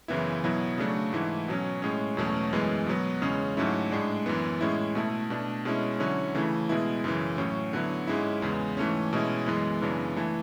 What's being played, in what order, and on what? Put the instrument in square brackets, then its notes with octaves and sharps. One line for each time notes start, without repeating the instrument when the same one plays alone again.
[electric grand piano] F#2 C#3 E3 B3 E4
B2 F#3 B3 E4
C#3 F#3 A3 D4
G#2 E3 A3 E4
B2 F#3 C#4
A2 G#3 C#4
E2 B2 F#3 A3 C#4
F#2 E3 G#3 B3
B2 F#3 B3
E2 C#3 G#3 C#4
G#2 F#3 A3 C#4 E4
A2 G#3 D4
F#2 E3 B3
A2 G#3 C#4 E4
B2 A3 E4
B2 A3 D4
B2 G#3 C#4 E4
D3 F#3 C#4 E4
C#3 E3 A3 E4
B2 G#3 B3 E4
F#2 C#3 E3
A2 F#3 C#4
D3 F#3 B3 E4
G#2 G#3 C#4 E4
E2 C#3 G#3 B3
G#2 E3 A3 C#4
B2 G#3 C#4 E4
F#2 E3 G#3 B3
F#2 C#3 E3 B3 D4
E3 A3 E4